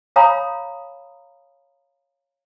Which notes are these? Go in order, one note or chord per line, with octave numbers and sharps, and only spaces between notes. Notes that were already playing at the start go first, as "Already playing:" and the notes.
C#5 F5 G#5 A#5 B5 D#6